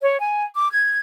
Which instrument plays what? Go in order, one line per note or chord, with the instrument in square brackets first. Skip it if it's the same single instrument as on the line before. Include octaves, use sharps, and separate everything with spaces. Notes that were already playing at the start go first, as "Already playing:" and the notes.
[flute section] C#5
G#5
D6
G#6